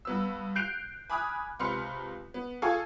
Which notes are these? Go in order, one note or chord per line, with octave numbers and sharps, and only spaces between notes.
G2 B3 E6
F#6 G6 C7 D7 F7
G#5 B5 D6 D#6 F6 F#6
C#2 C3 B4 C6 F6 C#7
B3
F4 G#4 A4 F5 G#5 C#6